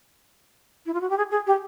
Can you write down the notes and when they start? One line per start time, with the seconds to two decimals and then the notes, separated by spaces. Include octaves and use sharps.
0.86 E4
0.94 F4
1.01 F#4
1.10 G4
1.18 G#4
1.31 G#4
1.47 G4